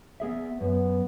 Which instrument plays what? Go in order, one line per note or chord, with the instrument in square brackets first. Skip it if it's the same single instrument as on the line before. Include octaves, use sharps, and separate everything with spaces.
[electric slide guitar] B3 G#4 E5
[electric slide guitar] F#2 [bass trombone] B3